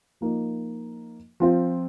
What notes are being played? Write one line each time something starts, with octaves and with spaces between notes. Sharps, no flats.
F3 A#3 D#4
F3 C4 F4